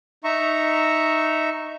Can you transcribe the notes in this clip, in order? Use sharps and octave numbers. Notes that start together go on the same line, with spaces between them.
D#4 E5 A#5 C#6